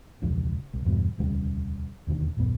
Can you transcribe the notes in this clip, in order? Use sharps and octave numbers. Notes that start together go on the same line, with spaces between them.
E1 C#2 F3 D4
C2
E2 G2 B2
E1 D2 C#3 G3
E1 D#2 D3 D#3
D#1 A#1 F#2 B3